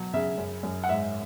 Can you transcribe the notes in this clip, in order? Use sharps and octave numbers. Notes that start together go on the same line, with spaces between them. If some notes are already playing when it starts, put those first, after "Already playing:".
Already playing: B2 F#3
C#3 E5
F#2
F#2
F#5
G#2 E5